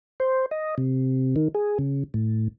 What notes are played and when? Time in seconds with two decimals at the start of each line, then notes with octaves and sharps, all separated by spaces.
0.20 C5
0.51 D#5
0.78 C3
1.36 D#3
1.55 G#4
1.79 C#3
2.14 A2